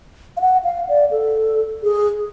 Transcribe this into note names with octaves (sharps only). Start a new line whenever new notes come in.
F5
F#5
F5
D5
A4
G#4